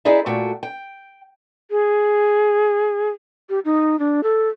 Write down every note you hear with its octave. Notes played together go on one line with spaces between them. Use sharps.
D#4 E4 G#4 D5 E5
A#2 A3 F#4 G5
G5
G#4
G4
D#4
D4
A4